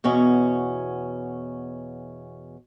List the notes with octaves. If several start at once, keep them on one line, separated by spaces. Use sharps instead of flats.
E2 B2 C#4 C#5